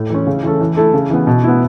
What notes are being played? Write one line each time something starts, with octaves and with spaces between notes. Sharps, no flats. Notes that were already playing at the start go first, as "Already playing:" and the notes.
Already playing: A2
E3 C#4
C#3
E3 C#4 A4
E3
A3 E4 A4
C#3
E3 B3
B2
B3 E4